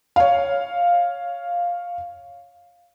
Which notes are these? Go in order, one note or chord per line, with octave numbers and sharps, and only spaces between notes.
C#5 F5